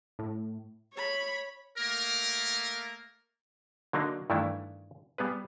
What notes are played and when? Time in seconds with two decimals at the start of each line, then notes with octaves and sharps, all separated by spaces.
0.19 A2
0.93 C#5 B5
1.78 A3 A#3 A#4
3.93 D3 F#3 A#3 D4 D#4
4.30 G2 D#3 E3 A3 D4 E4
5.18 G3 B3 G#4 B4